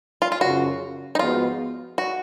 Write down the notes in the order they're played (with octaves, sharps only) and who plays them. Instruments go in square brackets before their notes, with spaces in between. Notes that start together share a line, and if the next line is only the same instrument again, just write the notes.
[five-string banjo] F4
F4
[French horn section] F#2 C#3 F3 [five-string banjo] F#4
[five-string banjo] D#4
[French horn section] G#2 F3 G#3 B3 F#4 [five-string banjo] F4
[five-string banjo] F#4